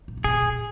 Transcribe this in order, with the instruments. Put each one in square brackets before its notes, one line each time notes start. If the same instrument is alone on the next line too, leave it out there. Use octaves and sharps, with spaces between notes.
[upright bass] A#2
C#3
[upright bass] B2 [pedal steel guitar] G#4
[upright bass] A#2